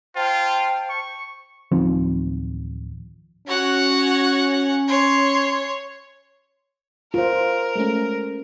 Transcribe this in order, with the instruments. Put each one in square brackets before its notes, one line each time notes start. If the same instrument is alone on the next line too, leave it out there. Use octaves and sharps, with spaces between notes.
[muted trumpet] F4 [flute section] C5 G5 A5
[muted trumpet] C#6
[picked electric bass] D1 D#3 F3 C4
[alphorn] C#4 [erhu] F#4 [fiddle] C#5 F#5
[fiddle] C#5 [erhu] C6
[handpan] F4 C5 [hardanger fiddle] A#4
[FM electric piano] G#3 A3 C#4